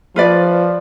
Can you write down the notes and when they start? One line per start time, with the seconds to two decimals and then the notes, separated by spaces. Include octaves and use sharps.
0.16 F3 F4 B4 D5